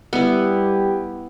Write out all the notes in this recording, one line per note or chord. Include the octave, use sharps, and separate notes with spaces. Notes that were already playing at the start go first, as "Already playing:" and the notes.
G3 B3 E4 G4